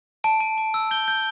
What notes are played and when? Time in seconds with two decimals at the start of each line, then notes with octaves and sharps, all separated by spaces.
0.24 A5 D7
0.40 A5
0.58 A5
0.74 E6
0.91 G6 G7
1.08 G6